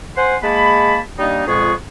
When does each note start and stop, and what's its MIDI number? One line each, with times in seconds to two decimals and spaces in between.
0.17 0.37 72
0.17 0.37 78
0.17 0.37 80
0.17 0.37 84
0.43 0.99 56
0.43 0.99 58
0.43 0.99 81
0.43 0.99 83
1.19 1.45 55
1.19 1.45 58
1.19 1.45 62
1.19 1.45 63
1.47 1.73 41
1.47 1.73 46
1.47 1.73 56
1.47 1.73 59
1.47 1.73 68
1.47 1.73 85